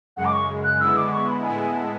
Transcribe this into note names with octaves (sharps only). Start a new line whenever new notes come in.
F#2 C#3 G#3 F#5
D6
C#6
F#6
D3 G#3 B3 E4 E6
D6
C#6
B5
A2 G#3 B3 E4 G#5
G#5
A5